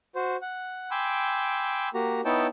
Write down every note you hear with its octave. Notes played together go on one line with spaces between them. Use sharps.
F#4 C5
F#5
G5 G#5 B5 C6 D6 E6
A#3 F#4 G4 A#5
B3 D#4 E4 C#5 G5 A5